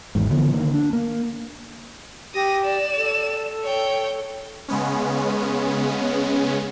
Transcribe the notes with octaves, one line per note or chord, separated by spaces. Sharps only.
G#1 E2 G#2
D3 E3 F3 B3
D3 D#3 A#3
D4
A#3
G4 D#6 A#6
D5 E7
A4
C#5 G5
C#3 G#3 B3 C#4